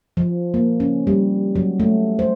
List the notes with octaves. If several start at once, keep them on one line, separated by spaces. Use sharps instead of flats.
F3
A#3
C#4
G3
F#3
A3
C5